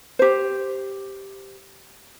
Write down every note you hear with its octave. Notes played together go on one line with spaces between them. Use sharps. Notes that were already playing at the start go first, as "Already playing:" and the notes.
G4 C5